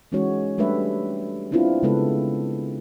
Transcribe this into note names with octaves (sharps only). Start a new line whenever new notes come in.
E3 G#3 C#4 D#4 F#4 C#5
G3 A3 D4 G4 B4 E5
B3 C4 D4 E4 F4 B4
C#3 G#3 B3 A4 B4